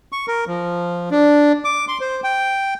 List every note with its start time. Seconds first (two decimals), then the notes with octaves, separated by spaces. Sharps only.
0.12 C#6
0.28 A#4
0.47 F3
1.11 D4
1.65 D6
1.88 C6
2.00 C5
2.24 G5